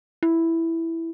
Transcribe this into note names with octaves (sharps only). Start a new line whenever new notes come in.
E4